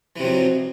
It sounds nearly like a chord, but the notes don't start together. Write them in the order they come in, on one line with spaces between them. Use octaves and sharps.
E3 C3 F#3 F2